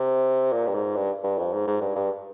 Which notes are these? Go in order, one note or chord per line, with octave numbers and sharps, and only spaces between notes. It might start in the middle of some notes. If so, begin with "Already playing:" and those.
Already playing: C3
A#2
G2
G#2
G2
G2
F2
G#2
G#2
G2
G2